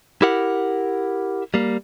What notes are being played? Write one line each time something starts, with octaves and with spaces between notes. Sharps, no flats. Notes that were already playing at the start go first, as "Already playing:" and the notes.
E4 G4 A#4 F#5
G3 A#3